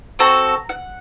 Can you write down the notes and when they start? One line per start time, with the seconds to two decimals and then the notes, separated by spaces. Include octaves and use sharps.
0.19 C4 F#4 A4 A#5
0.69 F#5